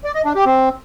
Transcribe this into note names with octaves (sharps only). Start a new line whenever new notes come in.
D5
D#5
D4
G4
C4